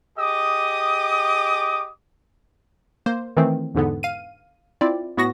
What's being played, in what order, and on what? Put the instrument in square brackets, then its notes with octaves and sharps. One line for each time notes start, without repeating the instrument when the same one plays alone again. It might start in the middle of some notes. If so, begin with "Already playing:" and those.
[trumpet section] G4 G#4 D#5 D6 D#6
[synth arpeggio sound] A#3 C5
D#3 E3 A3 C4
E2 G#2 D3 B3
F5 D#7
C4 E4 F4 D5
A2 B3 F#4 C#6 A#6